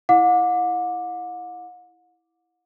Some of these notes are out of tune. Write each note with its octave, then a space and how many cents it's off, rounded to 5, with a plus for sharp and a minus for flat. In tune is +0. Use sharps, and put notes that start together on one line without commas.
E4 +0 F#5 -45 D6 +0